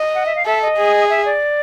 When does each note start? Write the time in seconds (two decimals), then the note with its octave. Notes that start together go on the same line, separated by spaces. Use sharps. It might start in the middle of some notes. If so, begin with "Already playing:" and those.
Already playing: D#5
0.14 F#5
0.25 E5
0.35 F5
0.45 A4 E5
0.61 D#5
0.77 G#4
1.09 E5
1.25 D5